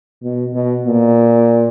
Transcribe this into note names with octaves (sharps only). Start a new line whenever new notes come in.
B2
B2
A#2